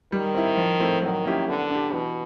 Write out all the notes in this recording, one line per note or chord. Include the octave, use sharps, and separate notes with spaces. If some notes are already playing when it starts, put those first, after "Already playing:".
D#3 G3
C4 E4
F3
A3 C4 E4
D#3 F#3
A#3 C#4 E4 G4
D3 B3
D4 G4
B2 E3